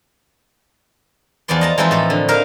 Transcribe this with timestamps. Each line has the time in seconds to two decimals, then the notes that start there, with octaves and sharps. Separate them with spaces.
1.48 E2 F3 B3 D5 C6
1.61 D#5 A5 A#5
1.78 E3 F3 G#3 C4 D#4 E4
1.91 A2 A4
2.10 D3
2.28 D#4 A#4 E5 F5